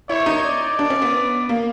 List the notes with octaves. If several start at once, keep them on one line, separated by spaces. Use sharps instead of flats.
E4 C#5
D#4
D5
D4
C#4
B3
A#3